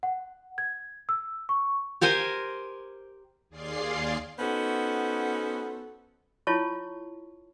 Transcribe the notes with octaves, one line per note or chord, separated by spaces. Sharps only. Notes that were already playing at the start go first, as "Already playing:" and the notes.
F#5
G#6
E6
C#6
G4 A#4 C5 G#5
D#2 G#4 D5 F5 C6 C7
B3 C#4 D#4 F#4 A4 C5
E4 F4 C#5 A5 C#6